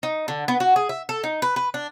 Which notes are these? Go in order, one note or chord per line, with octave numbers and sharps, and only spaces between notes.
D#4
D3
B3
F#4
G#4
E5
A4
D#4
B4
B4
D4